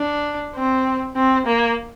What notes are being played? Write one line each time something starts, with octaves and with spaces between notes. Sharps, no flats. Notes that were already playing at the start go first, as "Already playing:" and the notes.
Already playing: D4
C4
C4
A#3